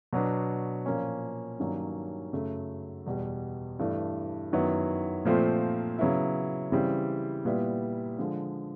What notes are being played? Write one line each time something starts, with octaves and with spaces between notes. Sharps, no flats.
B2 F#3 B3 D4
A#2 F3 A#3 C#4
G2 D#3 F#3 A#3 C#4
F#2 C#3 F#3 A3
E2 B2 G3
G2 E3 A3
F#2 D#3 F#3 B3 E4
A#2 F3 A3 C4
C#3 F#3 B3 E4
C#3 E3 G3 C4
A#2 G3 B3 E4
D3 F3 G#3